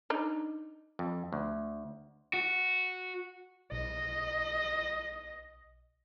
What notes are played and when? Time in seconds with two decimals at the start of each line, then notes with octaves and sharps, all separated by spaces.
0.10 D4 D#4
0.99 F2
1.33 D2
2.33 F#4
3.72 B1 D#5